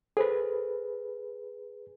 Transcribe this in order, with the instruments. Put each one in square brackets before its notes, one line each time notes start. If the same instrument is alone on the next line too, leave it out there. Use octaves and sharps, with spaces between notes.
[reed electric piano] G#4 B4 [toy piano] A4 C5